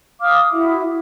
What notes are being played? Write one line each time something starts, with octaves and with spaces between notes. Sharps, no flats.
F5 D6 D#6 F6
E4 F#4 E5